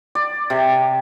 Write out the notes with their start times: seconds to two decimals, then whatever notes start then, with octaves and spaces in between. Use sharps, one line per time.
0.15 D5
0.50 C3